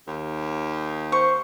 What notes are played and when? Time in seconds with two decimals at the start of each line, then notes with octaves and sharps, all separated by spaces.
0.07 D#2
1.12 C5 C#6